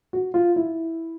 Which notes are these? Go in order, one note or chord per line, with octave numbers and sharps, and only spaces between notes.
F#4
F4
E4